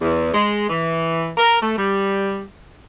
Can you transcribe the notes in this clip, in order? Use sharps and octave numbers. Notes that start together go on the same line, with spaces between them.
E2
G#3
E3
A#4
A3
G3